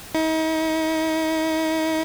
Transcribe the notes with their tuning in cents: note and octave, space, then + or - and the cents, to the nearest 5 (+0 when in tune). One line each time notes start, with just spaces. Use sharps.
D#4 +40